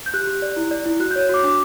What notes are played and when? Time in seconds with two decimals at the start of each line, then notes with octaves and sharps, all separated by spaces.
0.06 G6
0.14 G4 F#6
0.27 G4
0.42 D5
0.56 E4
0.71 D5
0.86 E4
1.00 F#4 F#6
1.11 G6
1.16 C#5
1.29 F#4 D6
1.44 D4